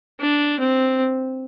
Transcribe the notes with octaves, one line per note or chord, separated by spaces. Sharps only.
D4
C4